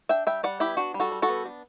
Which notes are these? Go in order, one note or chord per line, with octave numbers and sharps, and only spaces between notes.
D4 E5 G5
G3 E5 G5
G3 D5 F#5
B3 E4 G4
D4 F#4
G3
F#4 A4
G3
F#4 A4
B3
D4